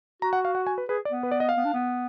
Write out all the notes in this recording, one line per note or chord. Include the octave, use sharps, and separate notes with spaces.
F#4 A#5
F#5
F5
F#5
G#5
B4
G#4 B4
D5
B3
B4
D5
D#5
F5
B3
D4
B3